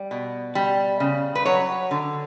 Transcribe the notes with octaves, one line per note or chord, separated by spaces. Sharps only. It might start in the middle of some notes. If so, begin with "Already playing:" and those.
Already playing: G3
B2
G3
C#3
B4
F#3 C#5
D3